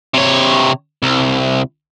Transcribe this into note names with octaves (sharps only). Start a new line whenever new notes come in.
C3 C#5
C2